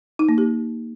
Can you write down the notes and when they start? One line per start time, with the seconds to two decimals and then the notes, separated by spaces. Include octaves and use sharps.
0.19 D#4
0.29 A#3
0.38 G4